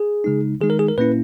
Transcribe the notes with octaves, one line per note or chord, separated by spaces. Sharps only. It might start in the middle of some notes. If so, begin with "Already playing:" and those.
Already playing: G#4
C#3 G#3 D#4
D#3 G#3 D#4 G#4
A#4
G#4
A#4
A#2 A#3 C#4 E4 B4